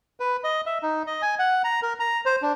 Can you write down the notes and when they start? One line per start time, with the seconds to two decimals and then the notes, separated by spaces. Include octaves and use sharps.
0.20 B4
0.44 D#5
0.66 E5
0.83 D#4
1.07 D#5
1.22 G#5
1.39 F#5
1.64 A#5
1.83 A#4
2.00 A#5
2.26 C5
2.42 D4